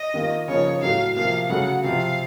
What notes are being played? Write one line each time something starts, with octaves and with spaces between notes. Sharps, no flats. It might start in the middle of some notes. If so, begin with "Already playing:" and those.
Already playing: D#5
D#3 A#3 F4
C#3 F3 A#3 D#4 C#5
A2 F#3 A3 F5
C3 F3 A#3 F4 F5
C#3 F#3 A3 F#5
C3 F3 C4 F5